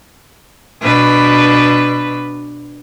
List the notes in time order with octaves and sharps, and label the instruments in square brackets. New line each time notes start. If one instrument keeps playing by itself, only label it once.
[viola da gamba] B2 D4 B4